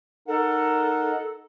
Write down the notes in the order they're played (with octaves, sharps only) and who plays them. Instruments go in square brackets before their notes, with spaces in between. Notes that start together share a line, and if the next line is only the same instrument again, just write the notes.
[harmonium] D#4 A#4 F#5 [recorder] A4